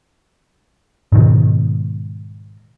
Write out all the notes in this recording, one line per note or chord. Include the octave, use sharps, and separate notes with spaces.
G#2 B2 D#3